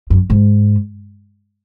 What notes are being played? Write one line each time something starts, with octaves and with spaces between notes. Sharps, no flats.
F#2
G#2